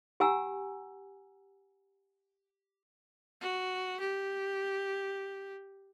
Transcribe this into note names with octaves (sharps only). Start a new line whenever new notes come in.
G4 F#5 G#5 A#5 E6
F#4
G4